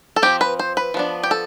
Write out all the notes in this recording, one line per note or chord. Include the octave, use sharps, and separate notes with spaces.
A4
F3 C4 G4
B4
C5
B4
F3 B3 D4
G4
A4